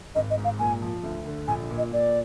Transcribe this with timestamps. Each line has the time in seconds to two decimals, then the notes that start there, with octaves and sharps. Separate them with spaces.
0.15 G#1 D#5
0.30 D#5
0.37 G#2
0.44 F5
0.59 A#2 G#5
0.82 F3
1.03 D2
1.26 D3
1.48 A#1 G#5
1.70 A#2
1.78 D#5
1.92 A#2 D5